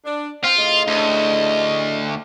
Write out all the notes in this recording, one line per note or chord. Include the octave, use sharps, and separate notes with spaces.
D4
C4 F4
A2 C#3 D#5
D2